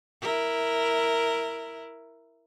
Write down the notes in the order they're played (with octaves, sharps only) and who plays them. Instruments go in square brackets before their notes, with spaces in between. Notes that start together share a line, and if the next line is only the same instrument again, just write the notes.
[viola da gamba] E4 A#4